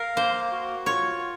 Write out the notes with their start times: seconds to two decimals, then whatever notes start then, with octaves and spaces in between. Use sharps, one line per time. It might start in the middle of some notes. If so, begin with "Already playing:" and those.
Already playing: A#4 F5
0.16 A#3 C5
0.52 F#4
0.86 F4 C#5